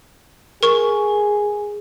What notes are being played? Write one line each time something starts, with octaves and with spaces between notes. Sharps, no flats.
G#4 A#4 C#6